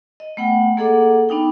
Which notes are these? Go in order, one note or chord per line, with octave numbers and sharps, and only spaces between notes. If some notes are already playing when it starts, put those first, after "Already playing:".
D#5
A3 B3 F#5 G5
A#3 G#4 A4 D#5 F#5 D6
B3 D4 D#4 G5